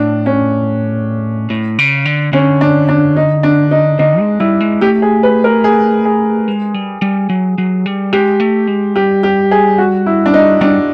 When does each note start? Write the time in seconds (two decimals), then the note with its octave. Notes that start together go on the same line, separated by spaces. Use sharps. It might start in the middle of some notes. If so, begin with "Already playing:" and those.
Already playing: A2 D4
0.26 C#4
1.50 A2
1.79 C#3
2.05 D3
2.33 D3 C#4
2.61 D4
2.89 D4
3.16 D#4
3.43 D4
3.71 D#4
3.99 D3 D#4
4.19 G#3
4.40 G3 E4
4.61 G#3
4.81 A3 G4
5.02 G#4
5.23 B4
5.44 A#4
5.64 G#4
6.05 G#4
6.48 G#3
6.74 G3
7.02 G3
7.30 F#3
7.58 F#3
7.86 G3
8.13 G#3 G4
8.40 A3
8.67 G#3
8.95 G3 G4
9.23 G4
9.51 G#4
9.78 F#4
10.06 E4
10.26 D4
10.34 D#4
10.61 G3 D4